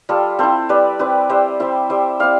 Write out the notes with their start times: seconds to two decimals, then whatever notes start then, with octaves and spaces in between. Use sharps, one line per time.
0.09 G3 F4 A4
0.39 C4 E4 A4 C5
0.69 G3 B4 D5
0.99 C4 E4 B4 D5
1.29 G3 C5 E5
1.60 C4 E4 C5 E5
1.90 G3 C5 E5
2.20 C4 E4 D5 F5